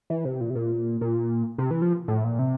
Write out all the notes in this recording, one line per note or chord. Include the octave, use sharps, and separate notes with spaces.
E3
C3
A#2
C3
A#2
A#2
C3
E3
F3
A2
A#2
C3